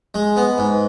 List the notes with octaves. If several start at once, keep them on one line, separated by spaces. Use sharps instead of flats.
G#3
B3
G#2